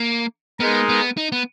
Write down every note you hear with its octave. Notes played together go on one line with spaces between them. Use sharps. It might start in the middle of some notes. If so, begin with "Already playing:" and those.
Already playing: A#3
G#3 B3 D#4 A#4
B3
D#4
B3